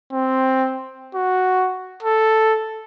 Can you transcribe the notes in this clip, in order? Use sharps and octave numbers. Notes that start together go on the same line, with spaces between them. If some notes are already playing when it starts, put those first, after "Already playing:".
C4
F#4
A4